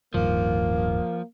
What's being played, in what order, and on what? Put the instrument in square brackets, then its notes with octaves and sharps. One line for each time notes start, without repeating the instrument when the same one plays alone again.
[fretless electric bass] D1 G2 D#3 [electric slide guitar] F3 [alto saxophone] A#3